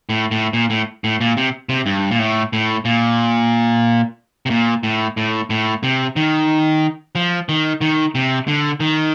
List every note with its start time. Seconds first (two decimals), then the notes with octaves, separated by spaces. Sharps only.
0.09 A2
0.31 A2
0.53 A#2
0.70 A2
1.04 A2
1.21 A#2
1.37 C3
1.69 C3
1.86 G2
2.11 A#2
2.19 A2
2.53 A2
2.85 A#2
4.46 C3
4.50 A#2
4.83 A2
5.17 A2
5.50 A2
5.83 C3
6.16 D#3
7.15 F3
7.49 D#3
7.81 D#3
8.15 C3
8.48 D3
8.80 D#3